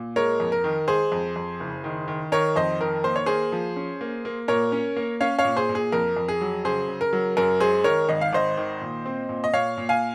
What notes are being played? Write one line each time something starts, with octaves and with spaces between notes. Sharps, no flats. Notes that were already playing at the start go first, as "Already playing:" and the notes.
Already playing: A#2
G#3 A#4 C#5
F2
A#4
D#3
G#3 G#4 C5
F2
F2
F#1
D#3
D#3
D#3 A#4 C#5
F2 C5 D#5
D#3 A#4
A#3 C5
C#5
A#3 G#4 C5
F3
C#4
A#3
A#3
A#2 A#4 C#5
C#4
A#3
C#4 C#5 F5
C#5 F5
A#2
G#4 C5
A#2
G#4
F2 A#4
F2
G#4
F#3
C#3 G#4 C5
C#3
A#4
F#3
F#2 A#4
G#3 G#4 C5
D#3 A#4 C#5
G#1 D#5
F5
G#1 C5 D#5
D#3
A#2
C4
A#2
D#5
A#2 C#5 F5
A#2
F5 G#5